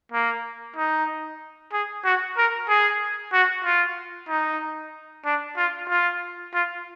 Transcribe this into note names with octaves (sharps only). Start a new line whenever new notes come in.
A#3
D#4
G#4
F#4
A#4
G#4
F#4
F4
D#4
D4
F4
F4
F4